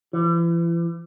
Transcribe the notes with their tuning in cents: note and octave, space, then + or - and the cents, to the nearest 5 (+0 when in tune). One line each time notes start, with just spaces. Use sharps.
E3 +40